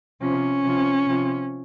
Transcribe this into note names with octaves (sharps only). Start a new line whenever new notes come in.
C3 F3 C#4
C3 F3
C3 F3